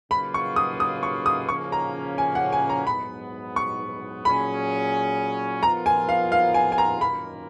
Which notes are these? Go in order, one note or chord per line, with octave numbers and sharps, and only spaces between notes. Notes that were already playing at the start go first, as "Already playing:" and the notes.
C#3 F#3 A#3 F4 B4 B5
C#6
D#6
D#6
C#6
D#6
C#3 F3 A#3 C#4 C#6
A#5
G#5
F#5
G#5
A#5
G#2 F#3 B3 B5
C#6
A#2 F#3 C#4 G#4 B5
F3 B3 F4 A#4 A#5
G#5
F5
F5
G#5
G#5
A#5
F#2 D#3 A#3 F4 A#4 B5